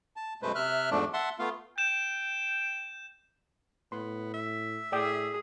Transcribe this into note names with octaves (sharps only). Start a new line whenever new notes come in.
A5
F#2 B2 G#3 A3 B4 C5
C3 E5 F6 F#6
E2 G#2 F3 A3 D4
E5 F#5 A5 C6
A3 B3 F4 F5
G5 G6 E7
A2 B3 C6
E5
A2 G#4 D5 G5 D#6